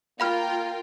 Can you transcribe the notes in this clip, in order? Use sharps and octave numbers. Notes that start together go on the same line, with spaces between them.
A#3 F4 A#4 F5 G5 B5 F6